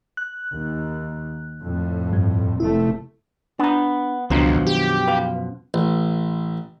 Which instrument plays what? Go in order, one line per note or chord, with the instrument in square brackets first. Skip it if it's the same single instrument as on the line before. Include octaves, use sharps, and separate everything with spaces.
[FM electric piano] F#6
[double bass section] D#2
F2 A2
[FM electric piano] G2
[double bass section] F1 C3 A3 [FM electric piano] E4
[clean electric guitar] B3 [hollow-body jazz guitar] D4 A#5
[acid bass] C#2 [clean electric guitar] F#2 B2 F3 [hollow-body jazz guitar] D#3 D4 A#5
[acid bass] G4
[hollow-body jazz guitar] B4 F5
[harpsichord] A1